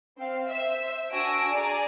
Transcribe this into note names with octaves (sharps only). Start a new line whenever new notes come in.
C4 F5
C5 E5
D4 F#4 G#5 E6 A#6 D7
G#4 D5 G#5 A#5